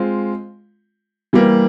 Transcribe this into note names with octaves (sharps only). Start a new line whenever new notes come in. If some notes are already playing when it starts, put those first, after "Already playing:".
Already playing: G#3 C4 F4
E3 G3 A#3